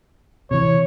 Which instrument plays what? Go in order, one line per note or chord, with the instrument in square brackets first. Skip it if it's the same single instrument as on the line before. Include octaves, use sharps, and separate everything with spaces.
[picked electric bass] C3 E3 [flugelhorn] C#5